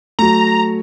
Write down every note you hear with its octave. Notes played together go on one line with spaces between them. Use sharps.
F#3 A3 A#5